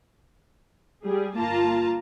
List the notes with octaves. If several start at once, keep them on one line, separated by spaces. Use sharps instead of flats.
G3 G#4
G1 A#3 F4 A5 A#5